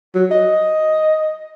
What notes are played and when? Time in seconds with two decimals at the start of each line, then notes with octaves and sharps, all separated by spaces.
0.15 F#3
0.31 D#5